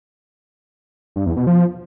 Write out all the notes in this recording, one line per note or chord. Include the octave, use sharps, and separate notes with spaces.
G2
E2
B2
F3